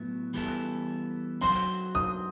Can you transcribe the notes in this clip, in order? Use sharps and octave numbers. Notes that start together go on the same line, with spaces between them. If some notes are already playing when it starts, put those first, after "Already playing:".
Already playing: A2 F#3 B3 E4
E3 G3 B3 E4 A4
F#3 C4 F#4 C5 C6
D#6